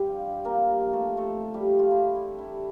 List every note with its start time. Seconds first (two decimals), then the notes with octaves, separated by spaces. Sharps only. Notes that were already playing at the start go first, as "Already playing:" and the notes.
Already playing: G2 G3 C4 G4
0.09 F3
0.26 G2
0.45 A#3 C4 A#4
0.63 C3
0.81 F3
0.93 A3 A4
0.99 C3
1.17 A3 C4 A4
1.36 C3
1.54 F3 G3 G4
1.73 C3
1.79 F4
1.91 G3 E4
2.09 D4
2.15 E4
2.26 E3
2.39 E4
2.45 C3